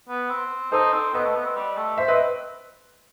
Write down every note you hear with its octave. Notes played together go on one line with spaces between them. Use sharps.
B3
C4
D#4 A4 C5
C4
B3 B4 D#5
A3
B3
C4
G3
A3
C5 E5
C4 B4 D#5